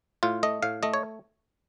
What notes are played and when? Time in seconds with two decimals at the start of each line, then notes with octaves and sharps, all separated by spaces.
0.23 A2 F4
0.43 A3 D#5
0.63 A2 F5
0.83 A3 D#5
0.94 C#5